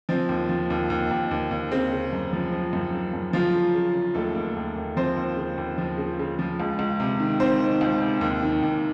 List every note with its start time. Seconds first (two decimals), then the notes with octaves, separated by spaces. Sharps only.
0.09 F3 C4
0.29 D#2
0.49 F3
0.70 D#2
0.90 D#2
1.11 D#2
1.31 D#2
1.51 D#2
1.71 C#3 C4
1.92 C#3
2.13 F#2
2.33 F3
2.52 F3
2.73 F#2
2.93 C#3
3.14 F#2
3.33 F3 F4
3.54 C#3
3.74 C#3
3.94 C#3
4.15 D#2 A3 A4
4.35 D#2
4.56 D#2
4.76 D#2
4.97 F3 C4 C5
5.16 D#2
5.37 C#3
5.58 D#2
5.78 F3
5.98 C#3
6.19 C#3
6.39 F3
6.60 C#2
6.79 C#2
7.00 C3
7.20 D#3
7.40 D#3 C4 C5
7.60 D#3
7.81 C#2
8.01 C3
8.21 D#2
8.42 D#3
8.63 D#2